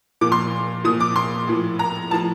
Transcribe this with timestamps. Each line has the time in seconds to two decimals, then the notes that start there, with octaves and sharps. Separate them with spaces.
0.21 A#2 F3 D6
0.32 C6
0.84 A#2 F3 D#6
1.00 D6
1.16 C6
1.48 A2 F3
1.79 A#5
2.11 A2 F3 A5